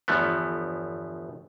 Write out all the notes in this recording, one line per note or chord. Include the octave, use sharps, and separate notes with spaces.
G1 E2 F3 A3 B3